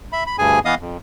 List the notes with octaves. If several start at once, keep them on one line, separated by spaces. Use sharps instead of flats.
E5 B5
B5
D2 G2 G#4 G#5
E3 B3 D#5 F5 D#6
F2